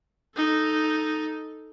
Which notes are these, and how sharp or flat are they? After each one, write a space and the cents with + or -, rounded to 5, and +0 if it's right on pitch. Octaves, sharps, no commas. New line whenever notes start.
D#4 +0 A4 +0